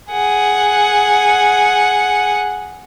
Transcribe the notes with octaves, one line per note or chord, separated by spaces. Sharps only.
G#4 F#5